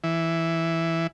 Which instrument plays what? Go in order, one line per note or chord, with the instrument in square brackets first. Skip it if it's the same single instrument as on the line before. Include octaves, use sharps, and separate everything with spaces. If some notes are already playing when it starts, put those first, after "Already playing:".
[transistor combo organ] E3